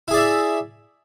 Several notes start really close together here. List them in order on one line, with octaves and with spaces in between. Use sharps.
E4 G#4 D5 E5